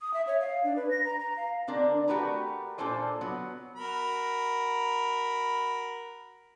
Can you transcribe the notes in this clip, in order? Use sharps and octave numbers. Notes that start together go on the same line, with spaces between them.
D#6
E5
C#5
F5
D4
B4
A#6
A#5
A#5
F5
D3 C4 D4 A#4
A3 F#4 G4 A#4 B4 A#5
A#2 D4 F4 A4 C5 G#5
F#3 B3
F#4 A#4 B5